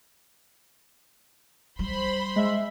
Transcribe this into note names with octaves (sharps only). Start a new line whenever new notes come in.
G3 C5 B5 C6
G#3 E5